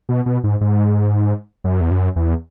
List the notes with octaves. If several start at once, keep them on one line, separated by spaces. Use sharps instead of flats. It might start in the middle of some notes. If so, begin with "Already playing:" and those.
B2
B2
G#2
G#2
F#2
E2
F#2
E2